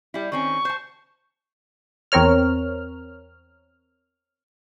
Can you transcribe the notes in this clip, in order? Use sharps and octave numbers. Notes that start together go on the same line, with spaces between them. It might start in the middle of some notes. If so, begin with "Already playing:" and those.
G3 E4
D#3 C4 C#4 C#6
C5 A5
E2 C4 A#4 C#5 F6